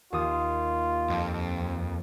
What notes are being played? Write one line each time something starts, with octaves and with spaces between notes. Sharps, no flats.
D#2 F4 D#6
F2